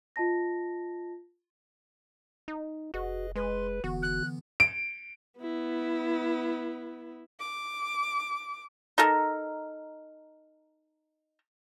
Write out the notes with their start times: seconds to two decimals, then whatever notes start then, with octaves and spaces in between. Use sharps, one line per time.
0.16 F4 D#5 A5 A#6
2.48 D#4
2.94 F1 F#4 G#4 B4 D#5
3.36 G#3 B4 C6
3.84 F1 D3 E3 B3 F#4
4.02 F#6
4.60 D7
5.40 B3 E4
7.40 D6
8.98 D#4 A4 A#4